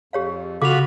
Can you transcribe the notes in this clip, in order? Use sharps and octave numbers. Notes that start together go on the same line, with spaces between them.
F2 G4 C#5 F5
C#3 F4 F#4 A4 F5 B5 D6 F7